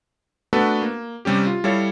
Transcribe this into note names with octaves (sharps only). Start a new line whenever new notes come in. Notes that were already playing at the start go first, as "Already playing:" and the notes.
A3 B3 D4 F#4 A4 B4
A#3
C3 G3 C#4 G4
F4
G3 E4 A4 C#5 F5